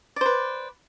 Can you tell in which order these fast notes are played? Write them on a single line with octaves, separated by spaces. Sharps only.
D5 C5 B4